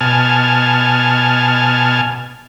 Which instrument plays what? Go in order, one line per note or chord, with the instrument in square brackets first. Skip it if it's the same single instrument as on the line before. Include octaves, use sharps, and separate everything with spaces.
[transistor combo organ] B2 G#5 A5 F6